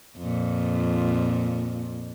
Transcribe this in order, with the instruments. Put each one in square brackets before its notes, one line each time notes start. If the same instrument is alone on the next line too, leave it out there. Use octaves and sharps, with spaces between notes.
[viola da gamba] F2 A#2